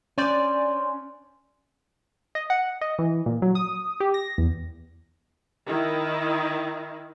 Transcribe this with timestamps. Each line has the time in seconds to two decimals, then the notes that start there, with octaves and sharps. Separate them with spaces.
0.18 C#4 D4 C5 D5 G#5
2.35 D#5
2.50 F#5
2.81 D#5
2.99 E3
3.26 A#2
3.42 F#3
3.55 D#6
4.00 G4
4.14 A#6
4.38 E2
5.67 D#3 E4